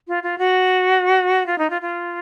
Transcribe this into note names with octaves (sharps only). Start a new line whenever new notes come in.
F4
F4
F#4
F4
D#4
F4
F4